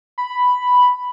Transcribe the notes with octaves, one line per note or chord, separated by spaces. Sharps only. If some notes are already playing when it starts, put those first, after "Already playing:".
B5